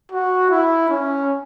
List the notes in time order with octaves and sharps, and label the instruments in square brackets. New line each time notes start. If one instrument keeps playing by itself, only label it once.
[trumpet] F#4
E4
C#4